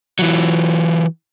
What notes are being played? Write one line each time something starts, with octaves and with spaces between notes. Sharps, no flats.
E3 F#3